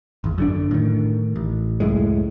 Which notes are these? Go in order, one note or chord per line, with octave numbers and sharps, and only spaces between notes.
G#1 E2
F#2 D3 D4
A2 D#3
A1
C#2 F#2 A2 G#3